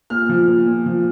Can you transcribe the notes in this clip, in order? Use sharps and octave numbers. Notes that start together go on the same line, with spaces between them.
A#2 F6
F3
A#2
A#2
F3